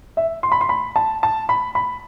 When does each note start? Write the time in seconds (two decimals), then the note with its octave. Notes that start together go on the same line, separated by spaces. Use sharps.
0.17 E5
0.43 C6
0.52 B5
0.61 C6
0.69 B5
0.96 A5
1.23 A5
1.49 B5
1.75 B5